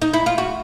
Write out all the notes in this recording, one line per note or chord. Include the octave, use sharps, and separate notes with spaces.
D#4
E4
F4
F#4